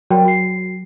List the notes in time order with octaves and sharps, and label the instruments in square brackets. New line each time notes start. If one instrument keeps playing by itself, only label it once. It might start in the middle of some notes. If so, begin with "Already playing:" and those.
[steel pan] F#3 [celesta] F#4 A#4 G5
[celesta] F#4 C7